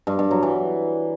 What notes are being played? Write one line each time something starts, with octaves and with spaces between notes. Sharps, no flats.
G2
G2
F#3
E3